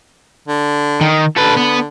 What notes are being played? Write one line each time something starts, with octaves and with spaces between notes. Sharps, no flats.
D3
D#3
D3 A4 B4
B3